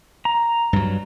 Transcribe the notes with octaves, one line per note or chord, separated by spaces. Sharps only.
A#5
G2 F#3